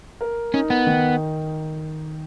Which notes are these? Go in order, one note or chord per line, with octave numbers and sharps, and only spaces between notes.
A#4
C#4 D#4
B3
D#3